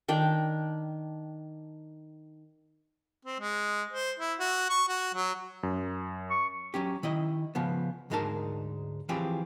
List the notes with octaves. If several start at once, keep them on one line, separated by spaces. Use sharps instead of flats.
D#3 D4 G5
C4
G#3
C5
E4
F#4
C#6
F#4
F#3
F#2
C#6
F#3 C#4 G4
D#3 E4 D#5
C#3 F3 B3
D2 G#2 G#3 D#4 A#4 A5
E3 F3 C4 G4 G#4